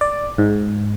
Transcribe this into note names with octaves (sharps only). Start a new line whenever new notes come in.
D5
G#2